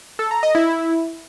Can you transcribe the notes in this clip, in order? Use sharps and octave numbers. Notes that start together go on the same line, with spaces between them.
A4
A#5
D#5
E4